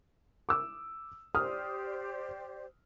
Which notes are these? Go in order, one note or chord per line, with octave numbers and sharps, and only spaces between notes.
D6 E6
G4 C5 D5 D#6 F6